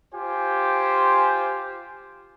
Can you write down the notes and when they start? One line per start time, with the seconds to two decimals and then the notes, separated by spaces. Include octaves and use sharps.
0.13 F4 G4 C5 G#5